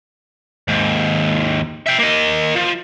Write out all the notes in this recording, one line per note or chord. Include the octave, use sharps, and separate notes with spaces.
D#2 G#2
E5 G5
A#3 D#5
F3